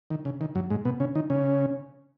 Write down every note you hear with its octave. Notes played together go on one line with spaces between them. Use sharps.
D#3
C#3
D#3
F#2 F#3
G#2 G#3
B2 B3
C#3 C#4
D#3 D#4
C#3 C#4